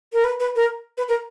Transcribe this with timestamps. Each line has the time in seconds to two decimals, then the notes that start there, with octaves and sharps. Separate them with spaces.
0.13 A#4
0.24 B4
0.40 B4
0.56 A#4
0.98 B4
1.08 A#4